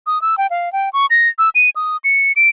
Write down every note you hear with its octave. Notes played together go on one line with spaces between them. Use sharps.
D#6
E6
G5
F5
G5
C#6
A#6
E6
D#7
D#6
C#7
D7